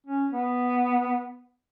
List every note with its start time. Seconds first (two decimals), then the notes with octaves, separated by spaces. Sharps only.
0.07 C#4
0.32 B3